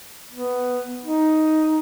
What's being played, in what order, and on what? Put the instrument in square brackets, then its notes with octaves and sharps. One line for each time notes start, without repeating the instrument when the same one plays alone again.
[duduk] B3
D#4